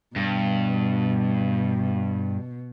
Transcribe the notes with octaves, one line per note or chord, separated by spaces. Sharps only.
G2 B2